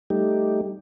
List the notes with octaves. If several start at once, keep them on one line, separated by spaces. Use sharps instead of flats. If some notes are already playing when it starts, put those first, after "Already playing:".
G3 A3 D#4 G4